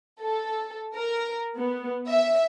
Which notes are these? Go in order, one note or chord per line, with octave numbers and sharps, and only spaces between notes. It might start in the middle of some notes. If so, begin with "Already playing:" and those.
A4
A#4
B3
E5